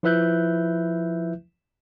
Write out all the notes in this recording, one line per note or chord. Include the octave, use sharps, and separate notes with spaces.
F3 E4 B4 E5 F#6 G6